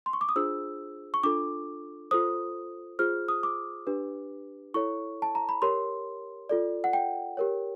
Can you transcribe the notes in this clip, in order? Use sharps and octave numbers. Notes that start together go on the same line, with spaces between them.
C6
C#6
D6
D#6
D4 F4 G#4 C5 E6
C#6
D4 F4 A4 D6
F4 A4 C5 D#6
F4 G#4 C5 F6
D#6
D6
D4 G4 B4
E4 A4 C#5 C#6
A5
A#5
B5
G4 A#4 C#5 C6
F4 A4 D5
F#5
G5
G4 A#4 C#5